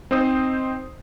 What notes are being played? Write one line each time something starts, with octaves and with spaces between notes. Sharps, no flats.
C4 D#4 C5 D#6